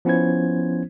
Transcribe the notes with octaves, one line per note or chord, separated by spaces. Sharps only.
F3 B3 C#4 E4 C5 G#6